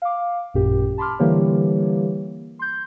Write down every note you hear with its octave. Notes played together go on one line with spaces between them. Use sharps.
F5 D6
A1 F#2 A#2 G4
A5 B5 C6 D6 F6
D3 E3 G3 A#3 G4 C#5
C6 G6